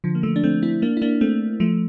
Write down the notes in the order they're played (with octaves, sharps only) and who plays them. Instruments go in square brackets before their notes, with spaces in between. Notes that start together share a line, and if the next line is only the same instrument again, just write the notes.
[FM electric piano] D3 F3
A#3
F3 A3
D4
A3 C4
C4 E4
A#3 D4
E4
A#3 D4
A3 C4
F3 A3